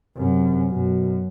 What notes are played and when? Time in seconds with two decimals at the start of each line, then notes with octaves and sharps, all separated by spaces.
0.17 F#2 C3
0.70 F#2 B2